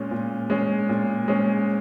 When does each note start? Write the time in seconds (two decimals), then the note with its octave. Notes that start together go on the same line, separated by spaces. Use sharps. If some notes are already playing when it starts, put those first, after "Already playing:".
Already playing: A#2 G#3 C#4
0.11 A#2
0.50 G#3 C#4
0.89 A#2
1.28 G#3 C#4